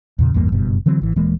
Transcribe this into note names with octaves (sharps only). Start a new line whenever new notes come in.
E2 A#2 C#3
A1 E2 G2 A#3
F#1 G2 B2
D3 E3 F#3 C4
G#1 E3
D#1 E3 G#3 A#3